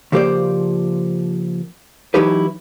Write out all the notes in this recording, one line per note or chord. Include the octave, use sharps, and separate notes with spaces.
C#3 F3 A#3 G4 C5 D5
E3 F#3 D#4 E4 G4 B4